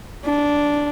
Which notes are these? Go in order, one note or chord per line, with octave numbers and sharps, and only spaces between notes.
D4